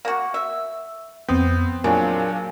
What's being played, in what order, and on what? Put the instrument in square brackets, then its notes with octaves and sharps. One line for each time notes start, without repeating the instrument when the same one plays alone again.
[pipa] A#3 F#4
E5
[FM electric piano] F2 D#6 G6 [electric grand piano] B3 [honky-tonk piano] C4
[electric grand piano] A#2 F#3 D4 [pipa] C#3 [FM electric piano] A#4